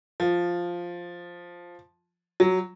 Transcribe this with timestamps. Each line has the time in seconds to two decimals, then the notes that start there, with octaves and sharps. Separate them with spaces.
0.20 F3
2.40 F#3